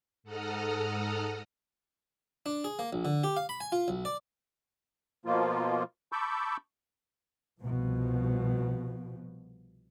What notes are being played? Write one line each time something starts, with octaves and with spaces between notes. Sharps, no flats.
G#2 A4 F#5 A#5 D#6 F6
D4
G#4
A#3
A#1
D3
G4
F5
B5
G#5
F4
B1
D5
B2 F3 A#3 F4
A5 B5 C#6 D6 E6 G6
C2 B2 F3